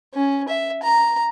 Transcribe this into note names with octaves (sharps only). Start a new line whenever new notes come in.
C#4
E5
A#5